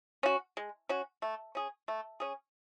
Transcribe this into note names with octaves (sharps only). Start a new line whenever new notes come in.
C#4 F#4
G#3
C#4 F#4
A3
C#4 G#4
A3
C#4 G#4